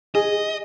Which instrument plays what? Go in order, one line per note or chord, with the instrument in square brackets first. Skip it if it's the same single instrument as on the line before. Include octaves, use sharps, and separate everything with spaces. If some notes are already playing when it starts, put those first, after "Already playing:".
[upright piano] G#4 [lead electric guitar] D#5